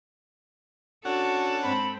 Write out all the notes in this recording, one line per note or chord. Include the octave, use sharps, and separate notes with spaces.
C#4 D4 F#4 A4 F#5
G#2 C4 B5